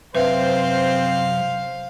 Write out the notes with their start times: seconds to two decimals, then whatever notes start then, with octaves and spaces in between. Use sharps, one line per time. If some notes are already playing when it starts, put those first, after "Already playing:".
0.15 F#2 C3 F#3 C4 B4 C5 E5 F5